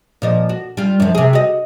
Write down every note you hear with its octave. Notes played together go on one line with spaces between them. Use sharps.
A#2 F3 D#5
F#4
G3 F4
F#2 F3
C3 G#4
F#4 D#5